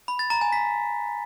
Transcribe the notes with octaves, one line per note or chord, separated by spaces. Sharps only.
B5
A6
A#5
G#5
B6